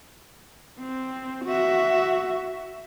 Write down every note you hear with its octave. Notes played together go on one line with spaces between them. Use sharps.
C4
F#4 E5